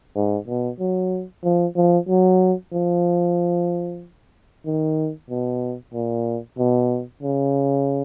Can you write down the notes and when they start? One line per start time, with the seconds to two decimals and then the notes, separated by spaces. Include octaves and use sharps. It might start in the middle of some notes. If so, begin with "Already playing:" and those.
0.16 G#2
0.47 B2
0.80 F#3
1.44 F3
1.76 F3
2.09 F#3
2.73 F3
4.66 D#3
5.30 B2
5.94 A#2
6.58 B2
7.23 C#3